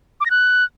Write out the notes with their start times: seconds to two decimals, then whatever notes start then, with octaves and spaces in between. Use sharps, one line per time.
0.21 D6
0.26 A#6
0.31 F#6